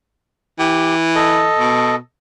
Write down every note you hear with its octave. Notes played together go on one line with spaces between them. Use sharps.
E3 G4 G5
A4 D#5
B2